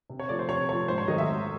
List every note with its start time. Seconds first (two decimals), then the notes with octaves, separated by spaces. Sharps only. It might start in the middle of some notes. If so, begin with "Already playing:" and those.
0.10 C3
0.20 C#5
0.29 F3 A3 D5
0.39 C5
0.49 C3 C#5
0.69 F3 A3 C#5
0.88 G#2 C5
0.98 C#5
1.08 D#3 F#3 A3 D#5
1.18 E5
1.28 G#2